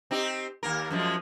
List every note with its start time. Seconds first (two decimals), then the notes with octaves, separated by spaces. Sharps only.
0.11 C4 D#4 G4
0.63 D#2 A#3 A#4
0.90 F#2 F3 G#3